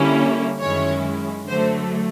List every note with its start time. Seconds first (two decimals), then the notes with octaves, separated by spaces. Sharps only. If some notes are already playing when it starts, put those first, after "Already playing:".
Already playing: D3 G3 A#3 C#4 E4
0.60 F#2 D#3 G#3 C#4 E4 C#5
1.49 D3 F#3 A3 C5